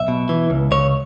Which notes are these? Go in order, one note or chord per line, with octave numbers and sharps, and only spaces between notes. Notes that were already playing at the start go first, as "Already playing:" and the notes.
Already playing: B1 E5
B2
E3
C#2
C#2 C#5